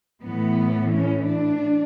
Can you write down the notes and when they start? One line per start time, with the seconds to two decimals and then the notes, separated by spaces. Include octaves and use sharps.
0.24 A2 E3 B3
0.93 C#4
1.27 D4